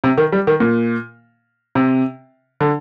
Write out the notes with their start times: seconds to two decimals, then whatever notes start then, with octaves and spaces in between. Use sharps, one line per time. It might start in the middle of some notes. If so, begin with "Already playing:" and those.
0.04 C3
0.18 D#3
0.32 G3
0.47 D#3
0.60 A#2
1.75 C3
2.61 D3